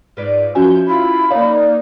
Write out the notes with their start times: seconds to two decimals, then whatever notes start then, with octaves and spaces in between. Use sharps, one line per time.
0.17 G#2 F4 B4 D5
0.55 F3 C#4 F#4 C#5 E5 F5 G#5 G6
0.87 E4 F4 B5
1.31 A#3 D#4 C#5 D5 F5